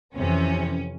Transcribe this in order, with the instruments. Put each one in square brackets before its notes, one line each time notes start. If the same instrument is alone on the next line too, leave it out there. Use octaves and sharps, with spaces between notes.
[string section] F2 C3 E3 C#4